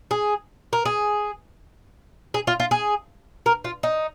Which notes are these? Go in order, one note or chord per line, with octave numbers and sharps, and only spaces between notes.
G#4
A#4
G#4
G#4
F4
F4
G#4
A#4
F4
D#4